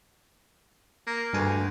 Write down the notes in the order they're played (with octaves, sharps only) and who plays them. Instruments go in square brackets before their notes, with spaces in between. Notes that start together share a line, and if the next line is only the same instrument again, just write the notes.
[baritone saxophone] A#3
[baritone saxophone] D2 [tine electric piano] G2 G#5